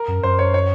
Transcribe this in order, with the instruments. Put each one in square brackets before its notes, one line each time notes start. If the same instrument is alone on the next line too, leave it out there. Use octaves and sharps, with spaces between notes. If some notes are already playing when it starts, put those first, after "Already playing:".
Already playing: [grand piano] A#4
[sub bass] F#2
[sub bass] F#2 [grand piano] C5
[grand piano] C#5
C#5